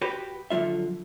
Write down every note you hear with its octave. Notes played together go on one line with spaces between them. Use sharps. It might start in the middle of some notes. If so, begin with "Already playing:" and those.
F#4 G4 B4
D3 F3 F#3 F4 E5